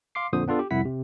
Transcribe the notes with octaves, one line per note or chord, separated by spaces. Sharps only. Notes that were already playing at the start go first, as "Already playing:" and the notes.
F5 C6 D6 C7
F2 A#2 D3 C5 D#6
B3 D4 F4 A4
G4
C2 F2 E4 F#5 B6
C3